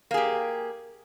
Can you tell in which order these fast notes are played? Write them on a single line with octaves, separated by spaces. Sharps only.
A#3 G#4 G4